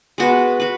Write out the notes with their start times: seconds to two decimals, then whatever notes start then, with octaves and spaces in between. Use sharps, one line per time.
0.18 G#3 B3 F#4 B4
0.60 F#4 B4